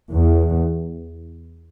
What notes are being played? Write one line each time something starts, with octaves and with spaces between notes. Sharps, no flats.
E2